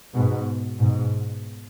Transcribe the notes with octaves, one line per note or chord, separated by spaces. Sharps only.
G#2 B2
G#2 B2